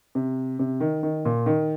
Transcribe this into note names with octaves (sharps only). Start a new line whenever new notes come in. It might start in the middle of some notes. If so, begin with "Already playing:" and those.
C3
C3
D#3
D#3
A#2
D#3